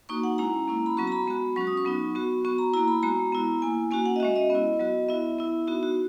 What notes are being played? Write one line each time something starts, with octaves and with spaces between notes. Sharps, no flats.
A#3 D#4 F#4 C#6
F#5
G#3 C#4 E4 A#5
A#3 C#4 E4
B5
F#3 B3 F#4 C#6
A#5
B5
G#3 B3 F#4
F#3 C#4 F#4 C#6
D#6
C#6
F#3 B3 D#4
B3 F#4
B3 F#4 C#6
A#5
A#3 E4 A#5
B5
G#3 B3 F#4 A#5
B3 E4
A#3 E4 G#5
A#3 C#4 F#4 G#5
F#5
D#5
G#3 C#4 F#4 E5
D#5
B3 E4
F#3 B3 F#4
B3 E4 E5
B3 E4
B3 D#4 F#4
F#4